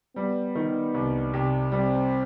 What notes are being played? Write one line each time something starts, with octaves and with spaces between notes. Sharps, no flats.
G3 B3
D#3
C2
C3
G3 C4